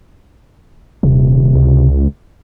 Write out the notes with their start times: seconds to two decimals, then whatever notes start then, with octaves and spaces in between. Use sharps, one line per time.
1.03 D#1 C3
1.55 C#2